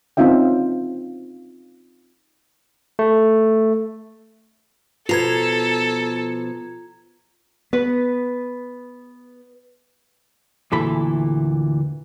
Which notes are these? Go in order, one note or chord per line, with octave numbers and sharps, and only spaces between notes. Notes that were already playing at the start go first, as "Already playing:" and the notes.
C4 C#4 D#4 F4 E5 G5
A3
B2 F3 F4 A4 A#5 G#6
B3 B4
D2 A#2 E3 A4 B5